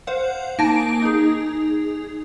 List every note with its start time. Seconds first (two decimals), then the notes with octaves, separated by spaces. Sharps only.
0.07 C5 F5 F#5
0.59 A#3 D#4 G#5 A5 A#6 D7
1.02 D#4 G#4